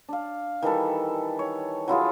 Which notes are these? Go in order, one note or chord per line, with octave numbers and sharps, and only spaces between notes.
D4 F5
D#3 E3 G3 A4
C#5
F#3 E4 F4 G#4